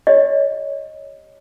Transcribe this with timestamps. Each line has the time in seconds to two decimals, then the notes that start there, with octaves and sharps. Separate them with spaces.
0.07 G4 C#5 D#5